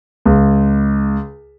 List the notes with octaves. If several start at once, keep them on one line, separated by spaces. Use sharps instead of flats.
C#2